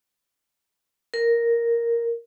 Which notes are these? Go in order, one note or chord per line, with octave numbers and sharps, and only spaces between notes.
A#4